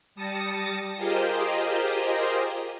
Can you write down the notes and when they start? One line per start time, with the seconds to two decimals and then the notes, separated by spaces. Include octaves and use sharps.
0.15 G3 A5 D#6 A6 A#6 C#7
0.96 F4 G4 G#4 A#4 C5 D#5